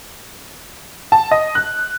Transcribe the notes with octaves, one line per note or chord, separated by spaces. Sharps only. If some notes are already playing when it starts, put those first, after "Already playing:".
A5
D#5
F#6